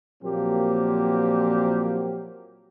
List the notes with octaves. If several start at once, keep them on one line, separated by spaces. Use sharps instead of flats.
A#2 F3 F#3 A#3 C4 G4